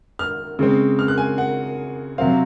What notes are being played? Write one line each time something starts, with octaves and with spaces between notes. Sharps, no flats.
F6
C#3 G#3 C4
F6
F#6
G#5
F#5
C3 F#3 C4 F5